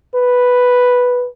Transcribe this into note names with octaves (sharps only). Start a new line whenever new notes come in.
B4